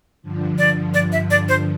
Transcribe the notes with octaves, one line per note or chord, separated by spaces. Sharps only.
G2 D3 F3
D5
D5
E5
D5
C5